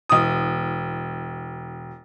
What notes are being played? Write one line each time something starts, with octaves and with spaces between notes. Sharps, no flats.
E1 D#6